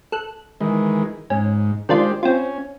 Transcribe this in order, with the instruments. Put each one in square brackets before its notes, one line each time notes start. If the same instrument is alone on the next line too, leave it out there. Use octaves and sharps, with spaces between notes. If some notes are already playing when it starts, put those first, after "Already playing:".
[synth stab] A4 F#6
[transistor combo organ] D#3 E3 G#3
[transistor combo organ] G#2 [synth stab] C#4
[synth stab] D#3 D4 F4 [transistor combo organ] G#3 G4 C5
[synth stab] C4 F4 [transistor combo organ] C#4